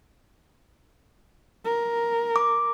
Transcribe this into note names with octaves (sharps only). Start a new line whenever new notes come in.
A#4
D6